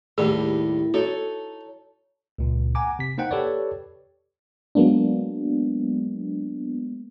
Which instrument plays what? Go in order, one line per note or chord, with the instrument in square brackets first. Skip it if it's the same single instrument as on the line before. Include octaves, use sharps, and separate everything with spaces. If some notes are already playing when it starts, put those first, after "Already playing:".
[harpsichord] D#2 D#3 G3 [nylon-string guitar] A2 [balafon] G#4
[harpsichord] D#4 [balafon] F#4 [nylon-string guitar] A4 C#5
[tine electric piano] C#2 A#2
F#5 G#5 A#5 D6
C3 B6
A#3 D#4 C5 F#5 G5
G4 A4 B4 C#5 D5
[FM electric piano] F#3 G#3 A#3 B3 D4